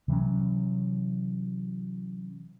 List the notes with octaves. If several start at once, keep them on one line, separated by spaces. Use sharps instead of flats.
C3 E3 F#3 C#4